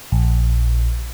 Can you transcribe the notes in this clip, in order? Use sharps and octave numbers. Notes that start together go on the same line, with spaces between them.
A#1